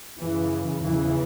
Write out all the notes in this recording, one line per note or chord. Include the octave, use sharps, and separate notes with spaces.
F#2 C#3 E3
E2 C#3 E3